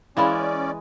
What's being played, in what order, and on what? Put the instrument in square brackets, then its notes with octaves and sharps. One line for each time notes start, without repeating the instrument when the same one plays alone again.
[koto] E3 G#3 [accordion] C#4 D5 [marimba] E4 F5 B5